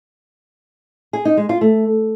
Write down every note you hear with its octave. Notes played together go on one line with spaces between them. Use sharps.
G#4
D#4
G#3
F4
A3